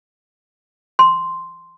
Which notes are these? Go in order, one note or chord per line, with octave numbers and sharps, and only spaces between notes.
C6